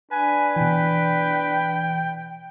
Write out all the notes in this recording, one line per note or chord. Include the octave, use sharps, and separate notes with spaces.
D4 B4 G#5
B2 E3 G5